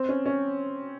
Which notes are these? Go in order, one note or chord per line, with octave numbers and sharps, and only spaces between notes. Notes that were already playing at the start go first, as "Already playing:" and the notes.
Already playing: C4
C#4
C#4